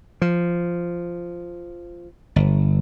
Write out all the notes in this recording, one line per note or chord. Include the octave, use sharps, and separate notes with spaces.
F3
G1